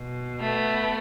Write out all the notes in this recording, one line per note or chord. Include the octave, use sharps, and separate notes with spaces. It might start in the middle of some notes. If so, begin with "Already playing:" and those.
Already playing: B2
A3 B3